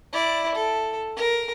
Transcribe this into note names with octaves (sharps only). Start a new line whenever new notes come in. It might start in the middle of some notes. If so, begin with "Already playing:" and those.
E4 D5
A4
A#4